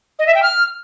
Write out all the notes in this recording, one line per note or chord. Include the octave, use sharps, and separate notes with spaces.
D#5
E5
G5
F6